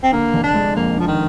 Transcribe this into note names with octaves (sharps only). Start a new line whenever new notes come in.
C4
D3 A#3
F1
D4
G#3
F2 A#3
D3 F3
D#3